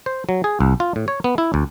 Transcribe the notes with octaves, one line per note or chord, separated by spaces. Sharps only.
C5
F#3
G#4
C2
F4
A2
C#5
B3
E4
D2